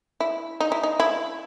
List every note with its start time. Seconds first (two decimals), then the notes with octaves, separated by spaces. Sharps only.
0.20 E4
0.60 D#4
0.72 E4
0.83 D#4
1.00 E4